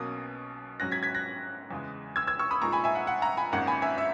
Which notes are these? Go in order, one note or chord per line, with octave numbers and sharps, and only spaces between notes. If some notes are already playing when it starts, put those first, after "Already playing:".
Already playing: B1 B2 A#3 C#4 D#6
G#2 F#3 C#4 F#6 A#6
G#6 B6
G#6 B6
F#6 A#6
E2 C#3 G#3
E6 G#6
E6 G#6
C#6 E6
B5 D#6
A#2 G#3 D#4 A#5 C#6
G#5 B5
E5 G#5
F#5
F#5
F#5 A#5
G#5 B5
G#1 G#2 D#3 A#3 C#4 F#5
G#5 B5
E5 G#5
E5